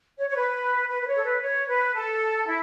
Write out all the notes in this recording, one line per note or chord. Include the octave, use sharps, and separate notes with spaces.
C#5
C#5
B4
B4
B4
C#5
A4
B4
C#5
B4
A4
E4